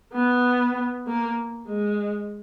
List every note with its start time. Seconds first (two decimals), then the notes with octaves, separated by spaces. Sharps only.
0.13 B3
1.07 A#3
1.67 G#3